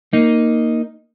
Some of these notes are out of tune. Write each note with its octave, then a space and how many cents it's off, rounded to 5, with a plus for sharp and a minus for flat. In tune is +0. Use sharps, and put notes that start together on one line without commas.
A#3 +0 D#4 +0